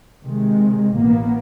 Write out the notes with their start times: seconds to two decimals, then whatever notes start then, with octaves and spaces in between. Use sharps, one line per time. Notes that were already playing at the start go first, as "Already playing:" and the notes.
0.22 C3 D#3 G#3
0.94 A1 B2 A#3 B3